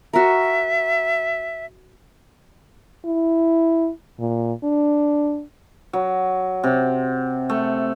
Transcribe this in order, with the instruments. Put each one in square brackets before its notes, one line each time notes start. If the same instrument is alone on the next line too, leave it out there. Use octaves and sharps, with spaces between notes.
[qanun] F#4 A#4 [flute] E5
[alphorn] E4
A#2
D4
[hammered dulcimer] F#3
C3
A3